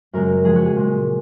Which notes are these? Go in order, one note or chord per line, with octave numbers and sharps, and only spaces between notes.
F#2 C#3 G#3 A#4
F2 F3 G#3 G#4
F#4
G#4
A#2 G#3